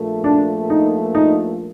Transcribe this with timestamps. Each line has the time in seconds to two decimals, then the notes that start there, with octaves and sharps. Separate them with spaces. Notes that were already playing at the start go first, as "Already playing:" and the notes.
Already playing: A#1 A#2 A3
0.24 D4
0.70 D#4
1.15 D#4